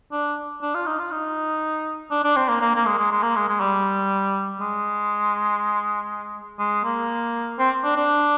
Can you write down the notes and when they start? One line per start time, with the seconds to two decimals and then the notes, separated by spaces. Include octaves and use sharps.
0.12 D4
0.62 D4
0.74 F4
0.86 D#4
0.99 F4
1.12 D#4
2.11 D4
2.24 D4
2.36 C4
2.49 A#3
2.61 A#3
2.76 A#3
2.86 G#3
2.98 G#3
3.11 G#3
3.23 A#3
3.36 G#3
3.48 G#3
3.60 G3
4.60 G#3
6.60 G#3
6.85 A#3
7.59 C4
7.84 D4
7.96 D4